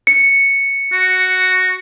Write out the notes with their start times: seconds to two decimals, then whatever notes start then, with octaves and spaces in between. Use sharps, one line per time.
0.07 C#7
0.92 F#4